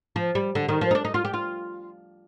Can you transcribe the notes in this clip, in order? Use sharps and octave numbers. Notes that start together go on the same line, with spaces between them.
F3
G3
D3
D#3
F3
D#4
D4
D#4
F4
G4
F4